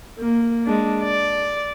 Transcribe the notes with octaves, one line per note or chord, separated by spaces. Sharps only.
A#3
G#3 D4
D5